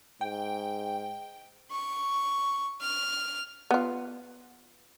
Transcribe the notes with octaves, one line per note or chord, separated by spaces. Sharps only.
G#2 G5
C#6
F6
B3 F4